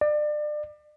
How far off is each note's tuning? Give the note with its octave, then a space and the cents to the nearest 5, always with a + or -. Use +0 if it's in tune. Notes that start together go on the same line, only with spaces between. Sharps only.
D5 +30